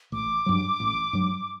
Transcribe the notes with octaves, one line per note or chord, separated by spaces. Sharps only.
A1 D6
G2 F#3
A1
G2 F#3